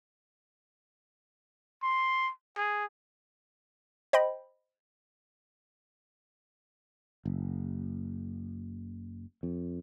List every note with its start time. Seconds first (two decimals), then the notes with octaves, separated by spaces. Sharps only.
1.83 C6
2.57 G#4
4.13 C5 D#5 G5 B5
7.25 F#1
9.43 F2